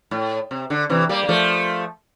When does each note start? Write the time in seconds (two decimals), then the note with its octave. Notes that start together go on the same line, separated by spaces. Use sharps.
0.11 A2
0.51 C3
0.70 D3
0.90 C3 E3
1.09 G3 A#3
1.23 A#3
1.29 F3 A3